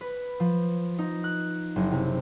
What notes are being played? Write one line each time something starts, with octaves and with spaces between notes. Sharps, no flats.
B4
F3
D#4
F#6
F#1
C3